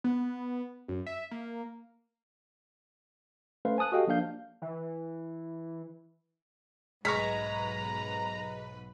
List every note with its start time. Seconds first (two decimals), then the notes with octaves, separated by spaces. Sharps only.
0.04 B3
0.88 F#2
1.06 E5
1.31 A#3
3.65 A3 C#4 B4 C5 F5
3.78 G#5 A5 D#6 F#6
3.92 F#4 G4 A4 D#5 F5 G5
4.07 F3 A#3 D4 F5 G6
4.62 E3
7.05 B1 G#2 G#3 B4 A#5 C#6 F6 B6